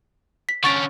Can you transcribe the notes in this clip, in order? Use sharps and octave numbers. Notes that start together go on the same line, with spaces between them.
B6
D3 C#4 C#6 A6 D7